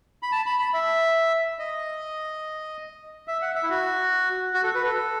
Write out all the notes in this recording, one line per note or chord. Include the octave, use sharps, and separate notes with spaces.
B5
A5
B5
B5
E5
D#5
E5
F#5
E5
E4
F#4
F#4
A4
B4
A4